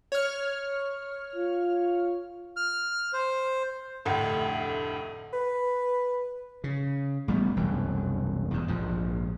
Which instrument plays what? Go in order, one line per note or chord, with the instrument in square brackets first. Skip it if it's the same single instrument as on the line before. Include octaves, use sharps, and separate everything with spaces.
[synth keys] C#5 F6
[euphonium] F4
[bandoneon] F6
C5
[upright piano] F1 D2 A2
[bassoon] B4
[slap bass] C#3
A1 G3 B3
E1 C2 F#2 E3
E2 G#2
A#1 G#2 F3